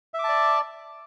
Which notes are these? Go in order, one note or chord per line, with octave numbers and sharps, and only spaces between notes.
D5 E5 A5 D6